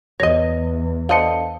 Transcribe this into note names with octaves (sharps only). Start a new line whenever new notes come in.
E2 C#5 D#5 A#6
D3 C5 D#5 F5 A5 C#7